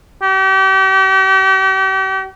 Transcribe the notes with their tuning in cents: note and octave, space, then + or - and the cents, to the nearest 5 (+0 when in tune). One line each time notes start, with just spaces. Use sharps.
G4 -40